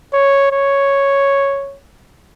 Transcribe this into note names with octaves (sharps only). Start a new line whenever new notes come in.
C#5
C#5